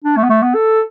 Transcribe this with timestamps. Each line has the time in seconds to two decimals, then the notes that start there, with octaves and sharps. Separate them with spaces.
0.04 D4
0.17 A3
0.24 B3
0.29 A3
0.42 B3
0.55 A4